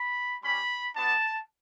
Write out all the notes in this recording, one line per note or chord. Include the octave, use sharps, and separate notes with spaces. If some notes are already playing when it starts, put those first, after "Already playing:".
Already playing: B5
G3 C#4 G4 B5
G3 B3 D4 F#4 A5